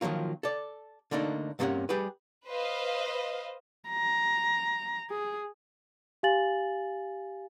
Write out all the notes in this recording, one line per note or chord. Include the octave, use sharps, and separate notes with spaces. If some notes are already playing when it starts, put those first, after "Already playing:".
D#3 F3 F#3 A#3 F4
A4 D5
D3 A3 A#3 D4 D#4
G2 C3 G#3 A#3 C#4 F#5
G3 G4 G#4 B4
B4 C5 D#5 F5
A#5
G#4
G4 F5 G#5 A6 F#7